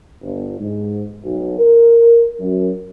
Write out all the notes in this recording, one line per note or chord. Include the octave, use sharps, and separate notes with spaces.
G1
G#2
B1
A#4
F#2